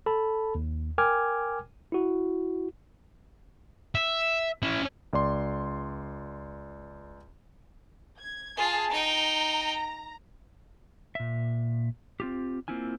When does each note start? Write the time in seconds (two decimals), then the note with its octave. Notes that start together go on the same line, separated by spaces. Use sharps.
0.06 A4 A5 B5
0.55 D#2
0.98 A#4 G5 G#5 D6 F6 G#6
1.92 E4 F#4
3.95 E5
4.63 C#4 E4
5.13 C#2 D5 C6
8.19 G#6
8.58 F4 G#4 A5
8.91 D#4 G5 A#5
11.15 A#2 E5
12.20 C4 F4 G4
12.68 A#3 C4 E4 F4 G#5